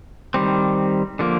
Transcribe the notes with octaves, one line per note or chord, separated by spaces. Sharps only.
D#3 G3 C4
D3 F3 A#3